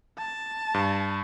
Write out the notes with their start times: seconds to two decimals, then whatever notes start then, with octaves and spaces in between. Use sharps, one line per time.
0.18 A5
0.74 G2